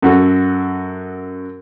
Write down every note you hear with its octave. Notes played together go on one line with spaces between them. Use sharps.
F#2 F#4 A4